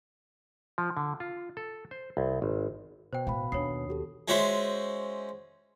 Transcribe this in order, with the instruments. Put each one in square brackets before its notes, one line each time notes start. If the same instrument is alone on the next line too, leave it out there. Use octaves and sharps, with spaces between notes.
[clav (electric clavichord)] F3
D3
F4
A4
C5
C2
G#1
[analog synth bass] B2 [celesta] C5 G5
[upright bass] A2 [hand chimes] F5 B5
[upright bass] D#2 [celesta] D4 C#5 C7 [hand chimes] D#6
[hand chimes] F#4 G4 A4
[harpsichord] G#3 C#4 F#4 C5 E5